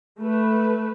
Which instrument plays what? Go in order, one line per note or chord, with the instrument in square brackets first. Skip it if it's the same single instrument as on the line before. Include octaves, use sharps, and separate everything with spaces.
[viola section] A3 B4